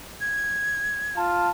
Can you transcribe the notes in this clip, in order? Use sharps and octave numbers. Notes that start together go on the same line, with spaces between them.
G#6
F4 A5